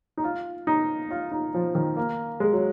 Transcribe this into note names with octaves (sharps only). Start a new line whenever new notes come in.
D#4
F4
D#4
F4
D#4
F3
D#3
A#3
G#3
F#3